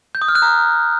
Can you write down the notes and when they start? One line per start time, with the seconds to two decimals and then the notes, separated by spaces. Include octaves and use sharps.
0.15 G6
0.22 D#6
0.28 F6
0.35 F#6
0.42 A#5